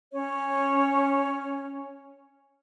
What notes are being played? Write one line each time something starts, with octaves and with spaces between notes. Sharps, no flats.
C#4 C#5